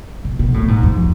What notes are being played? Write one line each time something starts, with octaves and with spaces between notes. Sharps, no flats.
B2
B2
A2
G#2
F2